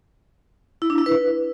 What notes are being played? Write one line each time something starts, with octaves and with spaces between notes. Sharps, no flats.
E4
D4
E4
B4